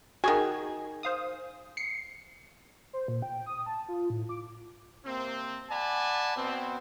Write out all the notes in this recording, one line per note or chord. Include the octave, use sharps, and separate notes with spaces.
D#3 F#4 G#4 G#5
C5 F5 D#6
C7 C#7
C5
A#2
G5
D#6
A5
F4
A2
D6
C3 A#3 C4
D5 F#5 G#5 A5 B5
B2 B3 C4